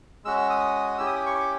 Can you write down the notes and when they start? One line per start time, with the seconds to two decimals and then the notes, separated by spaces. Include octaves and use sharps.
0.24 G#3 C#4 F#4 E6
0.37 E6
0.50 D#6
0.98 C#4 E4 G4 E6
1.07 D#6
1.16 D6
1.26 C#6
1.35 D6